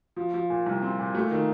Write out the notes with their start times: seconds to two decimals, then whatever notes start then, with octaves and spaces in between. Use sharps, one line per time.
0.16 F3
0.34 F3
0.50 A#2
0.66 C2
0.82 C4
0.99 A#2
1.15 A3
1.31 D#3